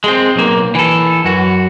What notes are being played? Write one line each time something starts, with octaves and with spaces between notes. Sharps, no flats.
G#3 C4
B1 A#3
E3 A4
F#2 F#4